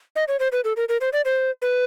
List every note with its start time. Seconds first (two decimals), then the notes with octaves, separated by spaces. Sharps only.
0.16 D#5
0.28 C#5
0.40 C5
0.52 B4
0.64 A4
0.76 A#4
0.89 A#4
1.01 C5
1.13 D5
1.25 C5
1.62 B4